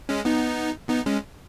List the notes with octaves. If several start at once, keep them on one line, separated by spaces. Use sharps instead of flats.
G#3 C#4
B3 D#4
B3 D#4
G#3 C#4